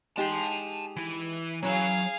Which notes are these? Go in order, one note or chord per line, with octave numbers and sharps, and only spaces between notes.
G#3 D#4 G4 A5 C6
E3 E4
E3 F#3 C#4 G#4 F5